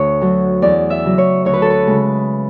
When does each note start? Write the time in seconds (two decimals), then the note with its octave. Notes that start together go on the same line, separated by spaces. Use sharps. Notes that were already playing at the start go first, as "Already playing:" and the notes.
Already playing: D2 C#5
0.21 D3 F#3
0.62 E2 D5
0.90 E5
1.04 C#3 F#3
1.18 C#5
1.45 D2 C#5
1.54 B4
1.62 A4
1.70 B4
1.87 C#3 G#3